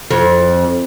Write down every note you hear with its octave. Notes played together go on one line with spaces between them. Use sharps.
F2